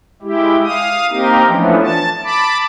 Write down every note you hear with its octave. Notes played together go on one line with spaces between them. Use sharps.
G#3 E4 G4
F5 D#6
A#3 C4 D#4 G4 A#4
E3 F3 A3 B3 C#4 D4
A5
A5 B5 D6